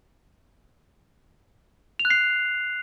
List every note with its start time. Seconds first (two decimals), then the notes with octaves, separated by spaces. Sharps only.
1.99 F7
2.05 F#6
2.10 C7